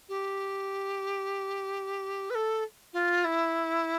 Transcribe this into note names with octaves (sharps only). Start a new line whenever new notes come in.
G4
B4
A4
F4
E4